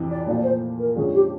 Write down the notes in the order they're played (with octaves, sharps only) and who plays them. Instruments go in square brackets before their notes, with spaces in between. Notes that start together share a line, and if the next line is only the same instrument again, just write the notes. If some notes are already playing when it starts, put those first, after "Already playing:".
Already playing: [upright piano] F2 C3 E3
[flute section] D5
[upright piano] A#2 F3 A3 [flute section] D5
[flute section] C5
A#4
[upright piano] F2 D3 F3 G#3 C#4 [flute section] G#4
[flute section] G4